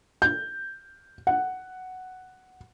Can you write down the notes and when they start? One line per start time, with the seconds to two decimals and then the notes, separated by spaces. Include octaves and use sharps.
0.22 G6
1.27 F#5